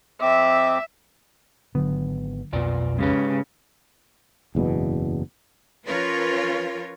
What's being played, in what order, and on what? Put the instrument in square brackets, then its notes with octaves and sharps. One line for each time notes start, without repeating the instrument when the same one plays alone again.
[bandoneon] F2 C4 D6 [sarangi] E5
[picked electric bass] G#1 B3 [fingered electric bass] D3 F#3
[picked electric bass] B1 F2 B3 [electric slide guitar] B2 F4 D5
[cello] C#3 [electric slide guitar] G#3 G4 B4
[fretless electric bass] F#1 E2 G#2 B2
[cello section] F3 C#4 F4 A#4 B4 C#5